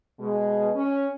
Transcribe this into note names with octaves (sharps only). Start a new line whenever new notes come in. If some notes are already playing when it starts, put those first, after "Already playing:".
B2 G#3
C#4